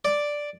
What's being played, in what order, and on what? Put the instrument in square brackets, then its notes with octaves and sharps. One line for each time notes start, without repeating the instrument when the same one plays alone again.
[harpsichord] D5